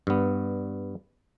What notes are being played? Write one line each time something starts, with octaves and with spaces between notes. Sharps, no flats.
G2 B3